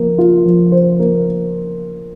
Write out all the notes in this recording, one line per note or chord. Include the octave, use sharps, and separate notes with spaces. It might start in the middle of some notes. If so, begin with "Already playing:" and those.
Already playing: F3 A#3
F4
F3
C5
A#3